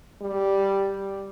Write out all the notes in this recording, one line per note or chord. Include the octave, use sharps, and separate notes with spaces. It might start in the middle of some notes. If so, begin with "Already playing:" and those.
G3